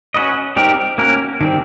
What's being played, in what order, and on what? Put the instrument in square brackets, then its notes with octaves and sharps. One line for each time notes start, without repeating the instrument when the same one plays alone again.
[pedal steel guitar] C#4 F#4 B4 D#5
G3 C4 D#4 G4 A#4
A#3 C#4 F#4 A#4
D#3 G3 C4